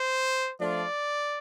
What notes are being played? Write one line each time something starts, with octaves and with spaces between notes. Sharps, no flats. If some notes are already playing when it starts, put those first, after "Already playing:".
Already playing: C5
F3 A3 D4 F4 D5